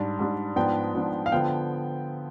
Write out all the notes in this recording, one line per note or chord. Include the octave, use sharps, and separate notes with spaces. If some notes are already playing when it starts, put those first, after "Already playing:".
Already playing: G#2 G3 D4
G#2 G3 D4
G#2 F3 B3 D4 G5
G#2 F3 B3 D4
F5
D3 F3 B3 G5